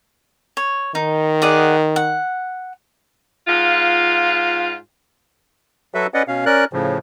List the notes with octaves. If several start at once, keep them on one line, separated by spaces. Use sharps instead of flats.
C#5
D#3 D#4
G#4 D5 F#5
F#5
G#2 F4
F#3 F#4 A4 B4 E5
C#4 B4 D5 D#5 F#5
B2 C#4 F5
C#4 A#4 D5 F#6
A2 C#3 F3